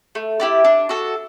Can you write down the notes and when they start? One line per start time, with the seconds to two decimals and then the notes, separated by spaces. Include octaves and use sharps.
0.15 A3
0.40 E4 G4 D5
0.64 D4
0.89 F#4 A4